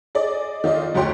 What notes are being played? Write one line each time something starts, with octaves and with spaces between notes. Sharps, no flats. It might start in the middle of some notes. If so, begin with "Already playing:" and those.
G#4 D5 D#5
D#3 F4 D5 D#5
F1 D2 F#4 C#5 G5 C6